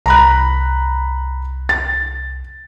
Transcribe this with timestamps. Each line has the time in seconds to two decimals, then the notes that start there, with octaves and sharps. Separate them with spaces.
0.06 C2 A#5 B5 F#6
1.69 A6